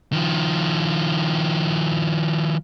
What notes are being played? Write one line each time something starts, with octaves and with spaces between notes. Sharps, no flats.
D#3 F3